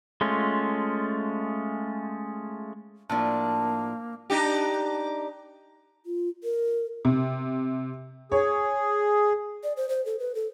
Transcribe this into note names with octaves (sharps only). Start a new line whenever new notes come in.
G#3 A3 C#4 F4
A2 F3 A#3 D4 A5
D4 D#4 G4
F4
A#4
C3
G#4 C#5
D5
C5
C5
A4
B4
A4